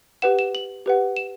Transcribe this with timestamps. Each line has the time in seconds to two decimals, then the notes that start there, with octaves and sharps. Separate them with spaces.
0.22 G4 B4 F#5 E7
0.39 E7
0.55 F#7
0.86 G4 B4 F#5
1.17 E7